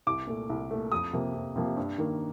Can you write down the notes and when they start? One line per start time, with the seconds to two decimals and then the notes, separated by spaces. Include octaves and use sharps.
0.07 C2 D6
0.27 A#2 A3
0.50 C2
0.71 A#2 A3
0.92 F2 D#6
1.13 C3 F3 A#3
1.35 F2
1.56 C3 F3 A#3
1.77 G2
1.98 D#3 A#3